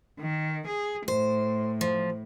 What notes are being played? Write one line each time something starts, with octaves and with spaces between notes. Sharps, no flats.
D#3
G#4
A2 C5
F3